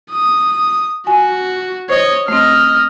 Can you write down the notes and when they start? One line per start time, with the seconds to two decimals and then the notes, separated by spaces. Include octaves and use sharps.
0.11 D#6
1.07 F#4 G#5
1.90 C5 C#5 D#5
2.28 A3 C4 D#5 F6